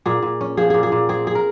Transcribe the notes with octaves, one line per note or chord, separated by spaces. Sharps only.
A#2 G#4
A#2
C#4
F3 G#4
A#2 G#4
G#4
A#2
C4 G#4
G#4
A#4